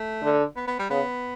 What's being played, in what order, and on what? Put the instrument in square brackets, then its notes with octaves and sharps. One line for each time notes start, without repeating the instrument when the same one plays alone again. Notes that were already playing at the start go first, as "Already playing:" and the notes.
Already playing: [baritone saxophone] A3
[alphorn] D3
[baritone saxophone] B3
B3
G3
[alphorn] C#3 [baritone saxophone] B3